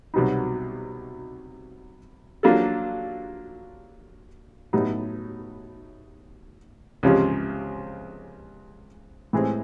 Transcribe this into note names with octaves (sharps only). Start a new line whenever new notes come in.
C2 B2 F#3 B3 D#4
F#3 A#3 D4 F4 A4
A2 F#3 B3 D#4
C#2 C3 F3 G#3 C#4
A2 E3 G#3 C4